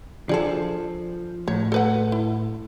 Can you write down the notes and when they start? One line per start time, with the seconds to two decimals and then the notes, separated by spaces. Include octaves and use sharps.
0.29 F3 D4 G#4 A4
1.48 A2 C#5
1.72 A4 B4 F#5
2.12 E4